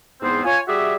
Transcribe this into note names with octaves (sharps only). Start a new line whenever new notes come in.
E2 G#2 B3 C4 C5
F4 C#5 G#5
G3 F#4 G#4 D5 E5